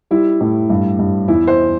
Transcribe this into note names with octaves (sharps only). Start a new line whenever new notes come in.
G3 E4
A2
G2
G2
E2 E4
C5